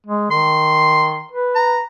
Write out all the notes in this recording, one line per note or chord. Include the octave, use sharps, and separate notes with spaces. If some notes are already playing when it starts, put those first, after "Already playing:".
G#3
D#3 C6
B4
A#5